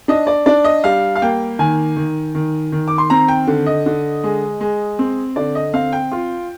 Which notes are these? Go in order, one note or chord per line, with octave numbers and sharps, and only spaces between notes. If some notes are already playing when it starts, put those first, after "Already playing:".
D4 D#5
D5
D4 D5
D#5
G3 F5
F5
A#3 G5
D#3 G#5
D#3
D#3
D#3
D6
C6
C4 A#5
G5
D3
D#5
D3
G#3
G#3
C4
D3 D5
D#5
C4 F5
G5
F4